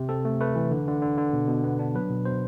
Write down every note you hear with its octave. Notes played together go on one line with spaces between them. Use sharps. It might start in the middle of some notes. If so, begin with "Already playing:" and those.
Already playing: C3
C4 A4
A3
A3 B4
E3
D3
D3
D3
D3
B2
B2
B3
D4
F#3 B4
B2
B2 C5